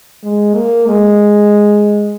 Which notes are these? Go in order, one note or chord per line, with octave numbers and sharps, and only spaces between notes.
G#3
A#3
G#3